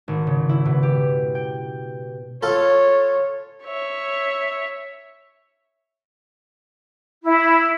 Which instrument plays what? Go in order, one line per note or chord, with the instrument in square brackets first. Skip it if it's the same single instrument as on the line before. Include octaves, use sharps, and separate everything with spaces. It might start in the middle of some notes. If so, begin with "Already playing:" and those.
[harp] G#1
C#3
E4
B2
G4
G5
[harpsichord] F4 A4 [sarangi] C#5
[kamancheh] C#5 E5
[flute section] E4